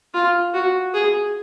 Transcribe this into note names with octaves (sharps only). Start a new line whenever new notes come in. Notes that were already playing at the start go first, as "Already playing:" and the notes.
F4
F#4
G#4